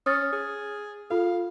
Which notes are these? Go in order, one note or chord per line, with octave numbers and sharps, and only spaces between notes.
C#4 D#6 F6 A6
G#4
F4 A4 F5